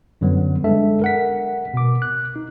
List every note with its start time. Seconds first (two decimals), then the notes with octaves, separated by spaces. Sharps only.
0.21 F#2 D3 F#3 G3 B3
0.64 G#3 D4 A4 E5
1.02 A#4 F#5 B6
1.74 B2 D6
2.02 F#6
2.36 D#4